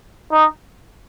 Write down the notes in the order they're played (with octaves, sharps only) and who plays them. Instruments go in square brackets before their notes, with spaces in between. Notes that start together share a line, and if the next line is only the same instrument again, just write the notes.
[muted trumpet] D#4